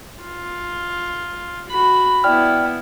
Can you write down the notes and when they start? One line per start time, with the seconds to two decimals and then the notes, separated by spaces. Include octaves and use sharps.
0.23 F4
1.70 F#4 B5
2.24 B3 E4 D5 G5 F6